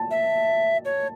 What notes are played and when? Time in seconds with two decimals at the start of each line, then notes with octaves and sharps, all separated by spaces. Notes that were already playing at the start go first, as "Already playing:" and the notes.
Already playing: A5
0.11 E5
0.85 C#5